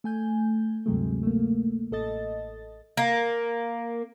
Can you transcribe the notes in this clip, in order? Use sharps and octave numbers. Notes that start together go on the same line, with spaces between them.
A3 G#5 G6
D2 G2 C3 F#3 G#3 A3
A3 A#3
A1 A4 D#5 A6
A#3